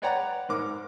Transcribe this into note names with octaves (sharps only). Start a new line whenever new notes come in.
B4 C#5 D5 F#5 G5 A#5
G#2 A#4 D6